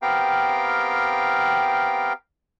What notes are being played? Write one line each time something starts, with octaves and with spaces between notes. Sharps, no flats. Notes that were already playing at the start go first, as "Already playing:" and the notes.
B3 C4 G4 A#4 F5 G5